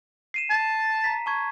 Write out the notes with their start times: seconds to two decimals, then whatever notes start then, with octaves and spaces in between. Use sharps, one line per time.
0.34 C7 D#7 E7
0.50 A5
1.04 A#5 B6
1.26 A5 C#6 G#6